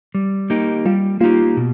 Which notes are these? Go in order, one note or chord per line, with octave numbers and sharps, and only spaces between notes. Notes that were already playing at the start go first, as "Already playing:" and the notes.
G3
A#3 D#4 G4
G3 F4
A#3 D#4 F4 G4
B2